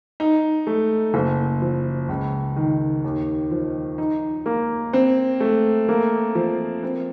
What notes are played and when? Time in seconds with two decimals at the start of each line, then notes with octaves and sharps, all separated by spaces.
0.20 D#4
0.67 A3
1.14 F#1
1.62 F3
2.09 C#2
2.56 D#3
3.04 D#2
3.51 F3
3.98 D#4
4.46 A#3
4.93 C4
5.40 A3
5.88 A#3
6.35 F3
6.83 C4